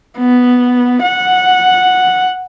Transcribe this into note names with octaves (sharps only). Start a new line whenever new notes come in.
B3
F#5